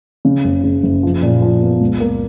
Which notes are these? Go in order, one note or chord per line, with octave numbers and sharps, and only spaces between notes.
C#3
F#1
C#3
F#1
F3
A#2
F3
B3
C#2
A#3